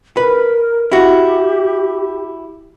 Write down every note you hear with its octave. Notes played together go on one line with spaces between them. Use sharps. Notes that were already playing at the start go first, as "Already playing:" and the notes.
A#4 B4
E4 F#4 G4